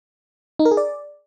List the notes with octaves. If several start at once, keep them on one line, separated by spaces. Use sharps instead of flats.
D#4
A#4
G#4
D5